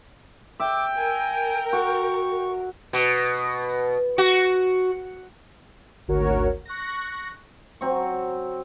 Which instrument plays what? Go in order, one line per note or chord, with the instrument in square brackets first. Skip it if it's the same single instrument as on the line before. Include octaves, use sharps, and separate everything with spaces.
[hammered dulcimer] E5 [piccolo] G5 [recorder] D6
[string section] A#4 [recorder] G#5
[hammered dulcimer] F#4 [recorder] C#6
[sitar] B2
F#4
[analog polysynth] G#1 D2 F#4 A#4 C#5
C#6 F#6 A#6
[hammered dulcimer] F#3 C4 C#6